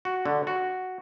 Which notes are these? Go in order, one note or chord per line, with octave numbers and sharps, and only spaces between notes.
F#4
D3
F#4